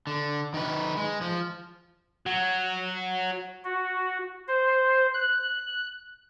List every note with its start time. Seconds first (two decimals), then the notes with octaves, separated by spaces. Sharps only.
0.07 D3
0.54 D#3 B4
0.97 G#3
1.21 F3
2.26 F#3
3.64 F#4
4.48 C5
5.14 F#6